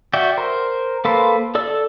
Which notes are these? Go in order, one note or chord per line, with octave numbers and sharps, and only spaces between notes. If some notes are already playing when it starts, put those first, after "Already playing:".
F#4 D5 E5 G5
A#4 C5
A#3 A4 B4 C5
A4 D5 E6